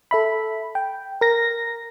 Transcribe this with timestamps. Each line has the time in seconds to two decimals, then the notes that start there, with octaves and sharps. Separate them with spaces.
0.11 A4 E5 B5
0.75 G5
1.21 A#4 A#6